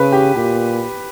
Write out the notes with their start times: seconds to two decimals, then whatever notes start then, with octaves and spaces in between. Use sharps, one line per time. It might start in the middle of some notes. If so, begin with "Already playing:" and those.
Already playing: C#3 B4
0.12 G4
0.35 A#2 G4